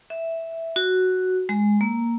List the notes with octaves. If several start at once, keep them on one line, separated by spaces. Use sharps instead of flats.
E5
F#4
G#3
A#3